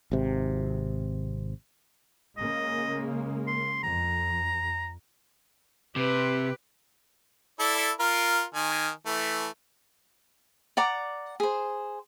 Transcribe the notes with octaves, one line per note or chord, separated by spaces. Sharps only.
G#1 C3
C#3 G#3 A#3 D#5
C6
F2 A#5
C3 G4 B4
E4 A4 D5
F4 A#4
D#3 G#5
E3 A3
D5 F#5 A#5 D6
G#4 C5